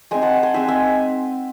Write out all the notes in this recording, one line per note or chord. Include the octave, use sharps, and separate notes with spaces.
G#3 C4 D#4 E5 G#5
F#5 A5
G#5 C6
G#3 C4 D#4 E5 G#5
E5 G#5